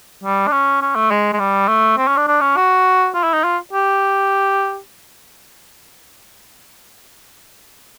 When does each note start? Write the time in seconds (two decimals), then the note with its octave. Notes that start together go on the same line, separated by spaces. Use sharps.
0.24 G3
0.47 D4
0.51 C#4
0.82 C#4
0.95 A3
1.11 G#3
1.33 G#3
1.39 G3
1.68 A3
1.97 C4
2.07 C#4
2.17 D4
2.27 D4
2.41 C#4
2.56 F#4
3.14 F4
3.23 E4
3.33 D#4
3.44 F4
3.73 G4